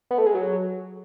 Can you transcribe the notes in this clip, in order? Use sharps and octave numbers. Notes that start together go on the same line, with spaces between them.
B3
A3
G#3
F#3